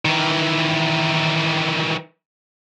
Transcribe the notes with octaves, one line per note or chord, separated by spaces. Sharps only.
D#3 E3